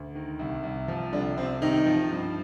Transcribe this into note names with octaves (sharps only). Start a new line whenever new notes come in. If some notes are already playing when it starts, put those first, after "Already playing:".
Already playing: D2
D#3
C2
C2
F3
C2 D3 D4
C2 C4
C3 D#3 D#4
F3
G2